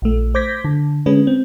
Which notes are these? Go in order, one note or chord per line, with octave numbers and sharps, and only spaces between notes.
A#1 A3
C5 D6 G6 G#6 A#6 B6
D3
D3 G#3 C#4 B4
C4